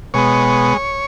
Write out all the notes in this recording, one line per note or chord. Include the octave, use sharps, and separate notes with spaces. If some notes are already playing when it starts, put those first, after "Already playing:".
B2 G#3 B3 C#5